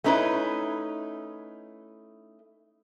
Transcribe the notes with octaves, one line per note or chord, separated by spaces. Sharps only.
A3 C#4 D#4 E4 B4